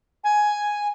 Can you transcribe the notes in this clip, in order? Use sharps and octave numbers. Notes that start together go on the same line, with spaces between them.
G#5